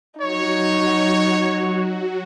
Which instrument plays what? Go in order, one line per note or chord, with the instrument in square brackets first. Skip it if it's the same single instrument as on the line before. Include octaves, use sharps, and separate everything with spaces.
[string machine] F#3 F#4 [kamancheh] D#4 [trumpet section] C#5